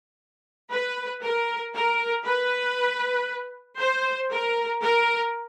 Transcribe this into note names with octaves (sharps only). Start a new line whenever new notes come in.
B4
A#4
A#4
B4
C5
A#4
A#4